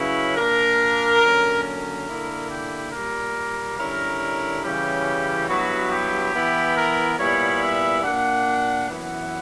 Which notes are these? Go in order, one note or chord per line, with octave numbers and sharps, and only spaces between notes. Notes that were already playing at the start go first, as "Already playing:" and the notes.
Already playing: C#3 F#3 C#4 E4 B4
A#2 A#3 D4 A#4
D3 F#3 A#3 C#4
A#4
D3 A#3 E4
G4
A#2 G3 A#3 A#4
D3 G3 C#4 E4 A#4
C#3 E3 G3 C#4 E4 G4
G2 F#3 B3 E4 F#4
G4
E3 B3 E4
A#4
A#2 G3 B3 E4 C#5
E5
A#2 A#3 D4 F#5
F#2 E3 B3 E4 F#5